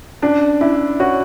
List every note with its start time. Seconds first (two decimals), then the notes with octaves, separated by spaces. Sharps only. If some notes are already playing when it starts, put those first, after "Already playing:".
0.22 C#4 D4
0.61 C#4 E4
1.00 F#4 C#5